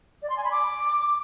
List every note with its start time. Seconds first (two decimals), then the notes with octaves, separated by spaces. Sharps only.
0.22 D5
0.30 C6
0.37 G#5
0.44 B5
0.52 D6